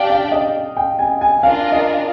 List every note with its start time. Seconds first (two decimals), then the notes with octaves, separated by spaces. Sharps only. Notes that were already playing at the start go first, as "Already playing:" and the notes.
Already playing: D4 G4 D5 F5 G5
0.10 F5
0.32 D#5
0.77 G5
0.99 G#5
1.21 G#5
1.43 D4 F4 A#4 F5
1.72 D#5